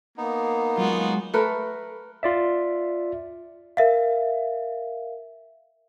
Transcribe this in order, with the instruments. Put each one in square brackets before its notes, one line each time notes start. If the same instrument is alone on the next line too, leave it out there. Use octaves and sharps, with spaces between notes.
[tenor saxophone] A#3 [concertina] B3 D#4
[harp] F#3 G#3 [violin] F4 F#4
[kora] A3 A#4 B4
[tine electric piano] F4 D5 E5
[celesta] A#4 E5 F5